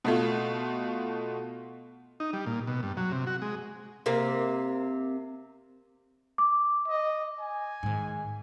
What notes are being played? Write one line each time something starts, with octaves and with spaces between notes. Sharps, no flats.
B2 A3 F4
D#4
G3
A#2
B2
G2
F#3
C3
F#4
G#3
C3 A#3
D6
D#5
G#5
G#2 D#3